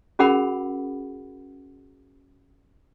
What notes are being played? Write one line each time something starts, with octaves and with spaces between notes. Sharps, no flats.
C#4 F#4 G#4 A#4 F#5 B5